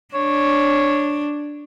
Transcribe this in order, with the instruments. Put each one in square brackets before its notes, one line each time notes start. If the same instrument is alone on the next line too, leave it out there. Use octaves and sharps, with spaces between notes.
[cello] D4 [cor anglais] C#5